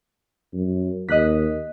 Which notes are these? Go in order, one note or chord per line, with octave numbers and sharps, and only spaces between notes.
F#2
D#2 D#5 F#6 B6